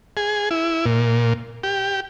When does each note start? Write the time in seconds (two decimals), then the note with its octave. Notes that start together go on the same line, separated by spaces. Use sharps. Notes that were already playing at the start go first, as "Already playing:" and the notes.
0.17 G#4
0.51 E4
0.86 A#2
1.64 G4